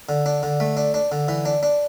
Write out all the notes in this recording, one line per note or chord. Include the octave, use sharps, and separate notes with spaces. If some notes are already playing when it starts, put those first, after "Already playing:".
D3
D4
D3
A3
D4
D4
D3
E3
D4
D4